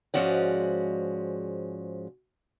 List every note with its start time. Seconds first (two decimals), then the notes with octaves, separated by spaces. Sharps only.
0.14 G#2 F3 G#3 C#4 F#4 D5